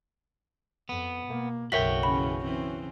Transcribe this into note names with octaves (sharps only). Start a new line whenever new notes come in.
F2 B3
B2 A#3
F#1 B1 F#4 A#4 C#5 E5 G5 B6
C#3 E3 C#4 B5
C#3 E3 C4 C#4